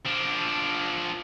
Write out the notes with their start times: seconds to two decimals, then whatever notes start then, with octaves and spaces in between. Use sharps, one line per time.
0.06 F3 D4